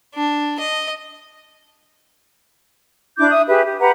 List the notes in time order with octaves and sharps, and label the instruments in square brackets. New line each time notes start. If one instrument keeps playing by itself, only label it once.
[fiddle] D4
D#5
[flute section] D4 E4 D6 G6
E5 D#6
G4 G#4 B4 E5
G4
G4 B4 F#5 A#5